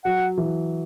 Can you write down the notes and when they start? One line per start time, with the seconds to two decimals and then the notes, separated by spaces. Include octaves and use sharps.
0.05 F#3 F#5
0.38 E3